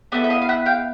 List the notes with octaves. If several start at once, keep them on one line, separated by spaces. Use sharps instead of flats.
B3 E4 A4 D5 E5
E5
D#5 F5
F5
E5 F#5
F5 G5